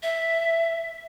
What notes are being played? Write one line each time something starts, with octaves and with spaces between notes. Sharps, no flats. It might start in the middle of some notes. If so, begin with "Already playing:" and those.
E5